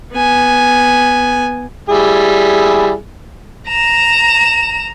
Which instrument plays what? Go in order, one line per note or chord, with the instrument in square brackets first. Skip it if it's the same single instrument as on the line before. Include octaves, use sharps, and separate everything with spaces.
[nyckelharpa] B3 G#5
[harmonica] G3 E4 G#4
[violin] A#5 E7